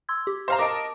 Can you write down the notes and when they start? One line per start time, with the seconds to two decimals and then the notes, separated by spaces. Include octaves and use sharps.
0.09 C6 E6 G#6
0.27 G4
0.48 C5 F5 A#5
0.59 A#4 D#5 A5 D6 D7